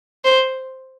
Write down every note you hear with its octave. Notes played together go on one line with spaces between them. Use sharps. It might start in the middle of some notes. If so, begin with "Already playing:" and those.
C5